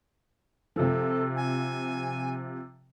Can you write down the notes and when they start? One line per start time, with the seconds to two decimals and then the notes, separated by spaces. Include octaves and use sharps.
0.76 C3 F3 A4
1.36 G#5